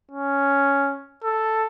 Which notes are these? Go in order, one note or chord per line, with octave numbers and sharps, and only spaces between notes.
C#4
A4